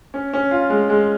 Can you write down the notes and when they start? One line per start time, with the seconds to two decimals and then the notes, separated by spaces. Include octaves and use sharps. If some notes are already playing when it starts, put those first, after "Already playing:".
0.14 C#4
0.33 C#4
0.51 F4
0.70 G#3
0.89 G#3